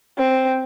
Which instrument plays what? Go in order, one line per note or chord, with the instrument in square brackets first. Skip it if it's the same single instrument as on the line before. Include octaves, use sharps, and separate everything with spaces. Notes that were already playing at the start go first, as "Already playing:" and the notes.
[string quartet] C4